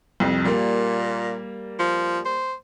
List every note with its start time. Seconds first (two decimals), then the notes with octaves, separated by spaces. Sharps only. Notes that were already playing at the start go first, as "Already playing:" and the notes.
0.20 C2 F2
0.45 A#2 G3 A#3
1.79 F3
2.25 C5